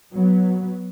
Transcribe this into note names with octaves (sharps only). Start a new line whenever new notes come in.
F#3 B3